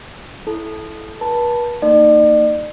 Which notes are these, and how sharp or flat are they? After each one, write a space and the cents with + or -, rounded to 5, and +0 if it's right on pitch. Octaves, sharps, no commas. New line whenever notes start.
E4 +0 A4 -20
B4 -40 A5 +0
A#3 -35 D#4 -15 D5 +40